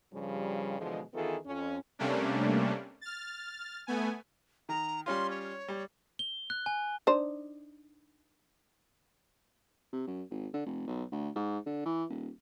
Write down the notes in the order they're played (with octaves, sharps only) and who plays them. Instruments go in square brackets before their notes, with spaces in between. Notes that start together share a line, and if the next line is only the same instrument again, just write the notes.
[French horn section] G2 C#3 F3 G3
B2 D3 E3 F3 G#3
D#3 E3 B3 F4 G#4 A4
F2 C#4
[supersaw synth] C3 G3 A3 A#3 C#4 D4
F6 A6
A3 B3 G#5
[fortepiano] D#3 [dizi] A#5
[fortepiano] G3 C#4 F4 [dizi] C6
[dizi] C#5
[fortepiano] G3
[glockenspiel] G7
F#6
G#5
[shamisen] D4 D#4 C5
[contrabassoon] C3
F#2
G#1
D3
F1
B1
D2
G#2
D3
E3
D#1